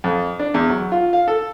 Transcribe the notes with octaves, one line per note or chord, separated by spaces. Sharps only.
F2
D4
E2
F#3
F4
F5
A4